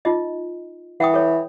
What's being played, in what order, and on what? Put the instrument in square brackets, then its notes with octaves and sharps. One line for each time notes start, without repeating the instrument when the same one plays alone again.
[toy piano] D#4 F4 D#5
[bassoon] E3 [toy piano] F#5 G5 D#6
[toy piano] A4 C#5